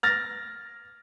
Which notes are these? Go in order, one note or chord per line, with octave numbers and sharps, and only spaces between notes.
F6 A6 A#6